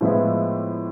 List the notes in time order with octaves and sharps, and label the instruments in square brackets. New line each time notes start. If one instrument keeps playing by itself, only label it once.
[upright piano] A2 F3 G#3 B3 E4